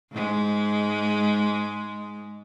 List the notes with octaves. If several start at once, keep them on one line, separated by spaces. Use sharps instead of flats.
G#2 G#3